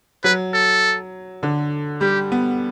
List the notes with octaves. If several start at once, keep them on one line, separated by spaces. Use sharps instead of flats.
F#3 B4
A4
D3
G3 G4
B3